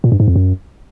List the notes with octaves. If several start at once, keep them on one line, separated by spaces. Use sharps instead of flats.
A#2
G2
G#2
F2
F#2